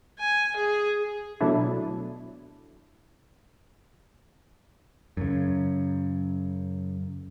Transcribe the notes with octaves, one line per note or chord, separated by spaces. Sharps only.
G#5
G#4
B2 F#3 A3 D4 E4
F#2 C#3